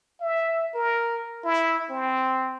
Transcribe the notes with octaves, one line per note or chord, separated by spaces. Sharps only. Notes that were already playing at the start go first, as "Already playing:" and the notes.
E5
A#4
E4
C4